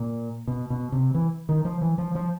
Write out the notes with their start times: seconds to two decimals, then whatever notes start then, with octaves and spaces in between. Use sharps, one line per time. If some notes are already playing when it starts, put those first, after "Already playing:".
Already playing: A#2
0.48 B2
0.70 B2
0.92 C3
1.15 E3
1.49 D#3
1.65 F3
1.81 E3
1.98 F3
2.15 F3